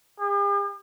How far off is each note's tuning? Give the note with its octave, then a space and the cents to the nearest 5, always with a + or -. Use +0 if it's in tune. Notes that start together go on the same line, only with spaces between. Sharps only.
G4 +45